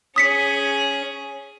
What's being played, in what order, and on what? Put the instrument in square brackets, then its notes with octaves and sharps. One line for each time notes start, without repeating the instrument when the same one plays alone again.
[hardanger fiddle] C#4 G#4 [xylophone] D#6 B6 C#7